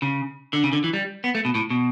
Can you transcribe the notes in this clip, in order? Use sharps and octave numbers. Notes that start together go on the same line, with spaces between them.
C#3
D3
C#3
D3
E3
G3
B3
A3
B2
A2
B2